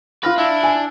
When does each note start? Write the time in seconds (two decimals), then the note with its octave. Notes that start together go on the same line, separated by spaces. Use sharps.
0.23 F4 B4 F6 A#6
0.38 D4 E4
0.64 G#5